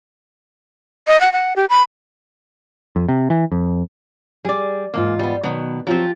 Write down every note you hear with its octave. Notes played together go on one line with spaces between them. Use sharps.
D#5
F#5
F#5
G4
B5
F2
C3
E3
F2
G3 G#4 D5
E2 G#2 A#3 F4
G3 B3
B2 D#3 F#3 B3
F3 F#3 C4 F4 G4